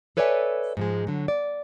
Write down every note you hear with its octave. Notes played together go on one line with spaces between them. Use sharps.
A4 B4 C#5 D5 E5 G#5
G#2 F3 G#3
D3 F#3
D5